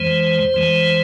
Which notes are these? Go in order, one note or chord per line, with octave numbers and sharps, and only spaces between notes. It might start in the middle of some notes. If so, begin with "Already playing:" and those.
Already playing: F2 E3 G#3 C5
F2 E3 G#3